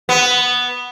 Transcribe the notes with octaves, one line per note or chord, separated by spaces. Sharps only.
B3